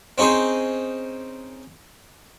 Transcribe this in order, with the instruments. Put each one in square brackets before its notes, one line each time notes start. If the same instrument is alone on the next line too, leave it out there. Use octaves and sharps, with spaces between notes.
[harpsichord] C4 C#4 D#4 G#4 C5